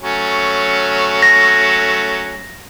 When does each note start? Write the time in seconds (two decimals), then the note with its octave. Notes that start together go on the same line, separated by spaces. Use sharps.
0.03 F#3 A3 C#4
1.22 A#6